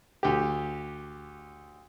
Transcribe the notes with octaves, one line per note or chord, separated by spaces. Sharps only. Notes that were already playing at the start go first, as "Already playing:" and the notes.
D2 G4